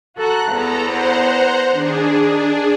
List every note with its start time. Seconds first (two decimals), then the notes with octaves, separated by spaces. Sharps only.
0.17 F#4 A4 A#5 F#6
0.51 E2 B3 A4 A#5
0.85 C5 F#5 A#5
1.73 D#3 D4 G#4